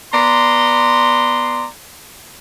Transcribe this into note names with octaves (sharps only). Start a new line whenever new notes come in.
B3 D5 A#5 C6